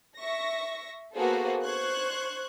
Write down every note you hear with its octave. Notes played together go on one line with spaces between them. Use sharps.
E5 C#6 A#6
A#3 B3 F#4 G#4 A4 C5
C5 C#6 F#6 G#6